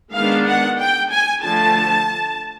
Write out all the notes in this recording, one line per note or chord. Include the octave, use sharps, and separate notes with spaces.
D#3 G#3 B3 D4 F5
F#5
G5
G#5
D3 F3 A3 A5